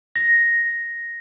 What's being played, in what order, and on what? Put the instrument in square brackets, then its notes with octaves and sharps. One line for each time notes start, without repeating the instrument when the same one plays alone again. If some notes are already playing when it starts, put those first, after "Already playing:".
[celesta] A#6